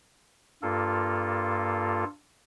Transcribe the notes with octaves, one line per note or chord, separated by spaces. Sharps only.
G2 A#3 F4 A4